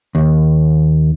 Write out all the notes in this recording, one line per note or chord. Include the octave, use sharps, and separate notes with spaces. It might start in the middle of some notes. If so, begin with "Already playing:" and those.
D#2